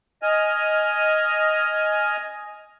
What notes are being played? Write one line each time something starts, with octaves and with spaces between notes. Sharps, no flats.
D#5 G#5 F6